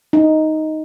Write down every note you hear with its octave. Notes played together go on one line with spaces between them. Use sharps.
D#4